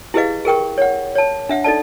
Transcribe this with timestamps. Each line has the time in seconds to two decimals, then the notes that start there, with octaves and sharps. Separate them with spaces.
0.14 E4 G4 G#4 B4 D#5 F5
0.45 G#4 A#4 G5 C#6
0.78 C#5 F#5
1.15 C#5 A5
1.49 D4 E5 F#5
1.64 D#4 A4 D5 A5